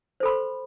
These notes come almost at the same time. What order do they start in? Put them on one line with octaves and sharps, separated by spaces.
C5 A4 B5 C6